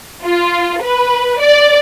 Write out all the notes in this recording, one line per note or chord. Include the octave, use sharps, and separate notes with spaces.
F4
B4
D5